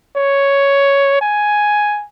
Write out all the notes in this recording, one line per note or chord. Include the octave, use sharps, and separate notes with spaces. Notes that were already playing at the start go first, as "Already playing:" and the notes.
C#5
G#5